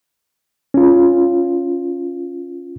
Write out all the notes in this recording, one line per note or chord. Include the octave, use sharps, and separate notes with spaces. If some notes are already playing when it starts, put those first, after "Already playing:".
C#4 F4